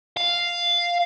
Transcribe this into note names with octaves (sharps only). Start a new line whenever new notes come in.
F5